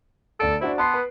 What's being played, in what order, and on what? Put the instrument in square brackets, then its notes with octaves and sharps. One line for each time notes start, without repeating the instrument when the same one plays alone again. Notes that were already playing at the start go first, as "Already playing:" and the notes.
[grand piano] D2 D5 D7 [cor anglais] A4
[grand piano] D4 F#4 C5 [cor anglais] E4
[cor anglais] B3 [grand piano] A5 C6 C7
[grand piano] B4